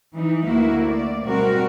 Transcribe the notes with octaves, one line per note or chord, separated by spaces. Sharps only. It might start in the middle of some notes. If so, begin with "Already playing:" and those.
E3 D#4
D2 A#3 E4 F#4
D5
B2 G3 C4 F#4 A#4